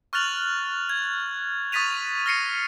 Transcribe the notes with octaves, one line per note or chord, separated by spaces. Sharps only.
C#6 F6 F#6 A6 F7 F#7
G#6
C#6 D#6 A6 B6 D#7 F7
F6 A#6 C7 C#7 D#7